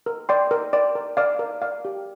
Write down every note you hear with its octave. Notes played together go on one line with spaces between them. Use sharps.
A#4
D5 G5 C6
A#4
D5 G5 C6
A#4
D5 F5
A#4
D5 F5
G4